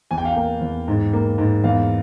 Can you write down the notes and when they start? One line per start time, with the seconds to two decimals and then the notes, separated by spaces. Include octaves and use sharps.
0.11 E2 G#5
0.18 G5
0.25 F5
0.33 A#3 G5
0.61 E2
0.88 G#2
1.13 A#3
1.38 G#2
1.64 E2 F5